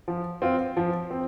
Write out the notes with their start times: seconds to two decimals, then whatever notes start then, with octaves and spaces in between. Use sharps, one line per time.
0.08 F3
0.42 C4 F4
0.77 F3
1.11 C4